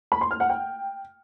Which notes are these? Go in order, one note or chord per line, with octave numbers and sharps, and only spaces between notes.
B5
C6
F6
F#5
G5